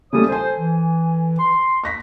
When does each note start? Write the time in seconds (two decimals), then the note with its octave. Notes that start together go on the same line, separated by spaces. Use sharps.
0.13 C#3 G3 A3 A4 C#5 D#6
0.29 A4 C5 G#5
0.58 E3
1.39 C6
1.84 C#6 A#6 B6